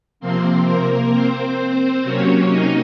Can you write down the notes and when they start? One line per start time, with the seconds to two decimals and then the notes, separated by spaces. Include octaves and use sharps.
0.20 C3 F3 A#3 C4 C5
0.66 A#3 A#4
1.12 C4 C5
2.04 C3 F#3 A#3 C#4 C#5
2.50 D#4 D#5